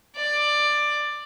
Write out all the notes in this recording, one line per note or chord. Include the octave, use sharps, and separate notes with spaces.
D5